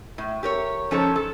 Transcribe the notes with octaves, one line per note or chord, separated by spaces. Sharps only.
A2
G4 A#4 C#5
F3 C#4 D#4 A4 C5 C#5
A4